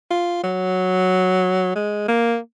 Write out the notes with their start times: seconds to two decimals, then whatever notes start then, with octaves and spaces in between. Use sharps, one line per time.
0.11 F4
0.44 F#3
1.76 G#3
2.08 A#3